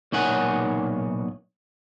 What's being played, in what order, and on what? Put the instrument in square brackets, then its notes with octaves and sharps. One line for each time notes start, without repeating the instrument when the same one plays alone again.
[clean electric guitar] B1 A#2 D#4 C#5 F#5 G#5